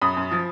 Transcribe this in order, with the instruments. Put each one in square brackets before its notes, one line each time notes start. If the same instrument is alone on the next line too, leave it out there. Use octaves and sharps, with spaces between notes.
[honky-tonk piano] F#2 B5 D#6
F#2
F3